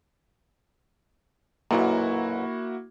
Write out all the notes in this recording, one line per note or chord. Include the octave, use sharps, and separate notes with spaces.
B1 F#2 A#2 A#3 E4 F#4